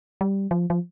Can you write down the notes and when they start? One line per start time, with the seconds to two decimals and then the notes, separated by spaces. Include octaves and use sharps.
0.21 G3
0.51 F3
0.70 F3